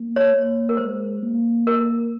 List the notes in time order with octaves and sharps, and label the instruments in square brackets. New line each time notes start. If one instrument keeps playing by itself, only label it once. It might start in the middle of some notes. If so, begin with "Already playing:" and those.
Already playing: [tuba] A#3
[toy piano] C#5
[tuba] A#3
[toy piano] A#4
[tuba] G#3 [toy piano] C5
[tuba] A#3
[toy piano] A#4